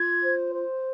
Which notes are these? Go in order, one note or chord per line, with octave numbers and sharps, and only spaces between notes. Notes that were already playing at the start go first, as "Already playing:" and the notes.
Already playing: F4 G#6
C5
C5